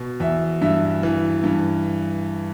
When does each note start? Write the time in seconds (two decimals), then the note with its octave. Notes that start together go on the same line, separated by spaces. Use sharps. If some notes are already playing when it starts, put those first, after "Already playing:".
Already playing: B2
0.20 E2 E5
0.62 G2 E5
1.03 E3
1.44 G2